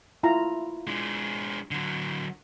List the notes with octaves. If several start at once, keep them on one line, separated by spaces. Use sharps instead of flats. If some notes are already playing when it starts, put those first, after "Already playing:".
E4 F4 A#5
G#3 D4
D3 F#3